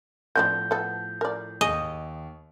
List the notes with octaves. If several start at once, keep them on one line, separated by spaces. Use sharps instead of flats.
A2 F3 B3 C4 D4 G6
B3 A4
A#4 D5
D#2 G#4 D#5 C#6